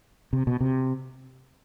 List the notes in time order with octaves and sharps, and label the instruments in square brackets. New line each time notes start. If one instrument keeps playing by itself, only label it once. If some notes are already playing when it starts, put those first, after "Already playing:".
[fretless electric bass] C3
B2
C3